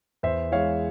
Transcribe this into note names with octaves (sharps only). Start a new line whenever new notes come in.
E2 C5 E5
E3 G#3 C#5 F5